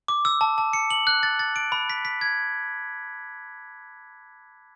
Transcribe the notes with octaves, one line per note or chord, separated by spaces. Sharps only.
D6
E6
A5
A5
C#7
F#7
F#6
A6
A6
D7
B5
B6
B6
G#6